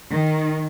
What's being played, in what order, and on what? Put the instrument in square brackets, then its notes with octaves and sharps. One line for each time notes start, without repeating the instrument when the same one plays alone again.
[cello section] D#3